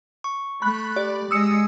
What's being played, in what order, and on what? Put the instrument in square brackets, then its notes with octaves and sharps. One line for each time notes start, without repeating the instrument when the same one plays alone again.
[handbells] C#6
[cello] A3 [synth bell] B5 F#6
[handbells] G4 [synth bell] D5
[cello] G#3 D#5 [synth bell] D#6 E6 C#7